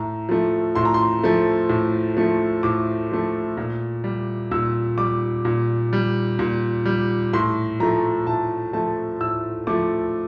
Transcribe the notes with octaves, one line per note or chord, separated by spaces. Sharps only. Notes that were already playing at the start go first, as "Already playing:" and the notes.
Already playing: A2 A#5
F3 A3
A2 C6
A#5
C6
F3 A3
A2
F3 A3
A2 D6
F3 A3
A#2
G3
A#2 E6
G3 D6
A#2
G3
A#2
G3
A2 C6
F3 A3 A#5
A2 A5
F3 A3 A5
A2 E6
F3 A3 D6